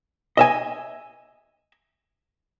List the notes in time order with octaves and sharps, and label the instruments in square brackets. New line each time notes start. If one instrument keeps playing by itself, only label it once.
[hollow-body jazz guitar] D#5 E5 G#5